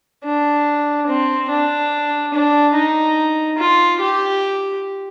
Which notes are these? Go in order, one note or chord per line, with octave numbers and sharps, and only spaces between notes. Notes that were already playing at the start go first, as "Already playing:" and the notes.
D4
C4
D4
D4
D#4
F4
G4